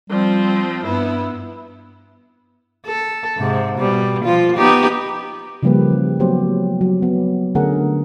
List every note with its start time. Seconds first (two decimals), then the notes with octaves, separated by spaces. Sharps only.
0.10 F3 G3 C4
0.84 G2 B3 E4
2.87 A4
3.37 G#2 C3
3.78 B2 G3
4.24 F3 F4
4.56 B3 D#4 G4
5.63 C#3 F3 G3 A#3 G4 B4
5.91 E3
6.20 F#3 A3 B3 G4 C5
6.81 F#3
7.03 B3
7.55 D3 A3 C#4 G#4 A#4 F#5